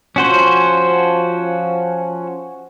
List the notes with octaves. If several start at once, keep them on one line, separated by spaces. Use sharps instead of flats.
F3 C#4 F#4 C5